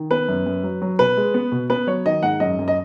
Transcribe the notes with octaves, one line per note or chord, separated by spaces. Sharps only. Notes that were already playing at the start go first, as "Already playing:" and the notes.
Already playing: D#3
B3 B4
F#2
F#2
F#3
F#3
B2 B4
G#3
B3
B2
B3 B4
F#3 C#5
D#3 D#5
G#2 F#5
F#2 D#5
F#2
D#5